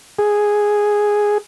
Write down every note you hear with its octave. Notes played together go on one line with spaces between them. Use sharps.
G#4